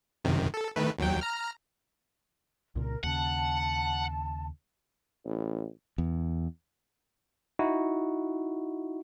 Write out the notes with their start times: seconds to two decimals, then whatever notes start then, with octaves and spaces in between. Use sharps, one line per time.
0.24 F#2 C3 D#3
0.54 A4
0.76 D#3 A3 B4
0.99 D#2 F#3 G5
1.21 A#5 F6
2.76 C2 A#2 C#3 A#4
3.03 D#2 C#3 F#5 A5
5.25 A1
5.98 E2
7.59 D#4 E4 F#4